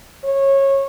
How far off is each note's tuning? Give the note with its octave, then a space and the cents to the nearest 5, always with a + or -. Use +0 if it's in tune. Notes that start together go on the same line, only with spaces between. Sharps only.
C#5 -20